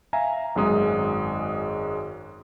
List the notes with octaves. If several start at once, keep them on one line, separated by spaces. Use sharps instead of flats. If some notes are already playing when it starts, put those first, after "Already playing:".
E5 F5 G#5 A#5
G#1 F#2 G#3 D#6